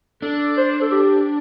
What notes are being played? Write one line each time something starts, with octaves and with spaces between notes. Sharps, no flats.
D4 A4
C5
A4
G4